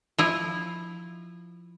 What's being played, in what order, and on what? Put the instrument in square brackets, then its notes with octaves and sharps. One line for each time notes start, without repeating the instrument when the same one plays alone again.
[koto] F3 E4